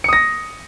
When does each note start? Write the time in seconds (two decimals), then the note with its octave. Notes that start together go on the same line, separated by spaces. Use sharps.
0.04 C#7
0.08 D#6
0.13 A#6